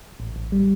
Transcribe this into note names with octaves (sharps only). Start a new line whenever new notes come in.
A1
A1
G3